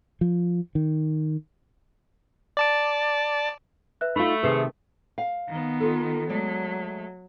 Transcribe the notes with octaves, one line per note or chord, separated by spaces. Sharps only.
F3
D#3
D5 A5 D6
B4 E5 F#6
A3 D#4 F4 B5
C3 D#3 G#4 A4 B4 C5 C7
F5
D#3 B3
F4 A4
F#3 G#3 A3 D5